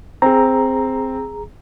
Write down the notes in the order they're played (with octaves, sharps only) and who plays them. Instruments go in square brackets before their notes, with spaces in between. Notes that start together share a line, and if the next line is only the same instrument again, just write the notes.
[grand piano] C4 [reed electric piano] G#4 A#5